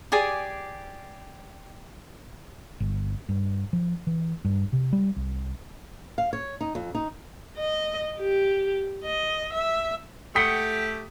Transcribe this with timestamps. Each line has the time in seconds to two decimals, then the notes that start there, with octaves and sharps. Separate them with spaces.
0.12 G4 G#4 D5 G#5
2.80 G1
3.29 G2
3.73 F3
4.07 E3
4.45 G2
4.73 C3
4.93 G3
5.16 C2
6.18 F5
6.33 C#5
6.61 D#4
6.75 F2
6.95 D#4
7.58 D#5
8.20 G4
9.04 D#5
9.53 E5
10.35 A3 G4 F#5 G5 D#6 B6 G7